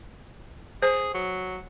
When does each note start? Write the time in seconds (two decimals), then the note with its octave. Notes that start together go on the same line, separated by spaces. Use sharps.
0.82 G#4 C5
1.14 F#3